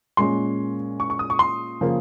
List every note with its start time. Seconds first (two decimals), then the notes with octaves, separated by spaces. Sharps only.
0.17 A#2 G#3 C#4 C6
1.00 C#6
1.10 C#6
1.19 D#6
1.30 C#6
1.39 C6
1.81 C#3 F3 A#3